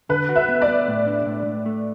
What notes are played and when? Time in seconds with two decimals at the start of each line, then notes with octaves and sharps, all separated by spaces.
0.09 D3 B4
0.29 F#4
0.35 B4 E5
0.48 B3
0.62 D5
0.68 B3
0.88 A2
1.06 D4
1.26 A2
1.46 A2
1.66 A3